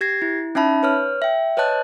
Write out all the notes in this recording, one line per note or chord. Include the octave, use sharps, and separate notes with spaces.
G4 G#6 A#6 C7
E4
C#4 D#4 E5 A5 B5
B4 C#5 F6
E5 G5
B4 C#5 D#5 A5 F#6